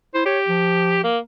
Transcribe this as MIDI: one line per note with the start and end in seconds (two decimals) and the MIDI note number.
0.14 0.23 64
0.14 0.22 72
0.25 1.00 67
0.25 0.39 73
0.48 1.08 53
1.03 1.18 58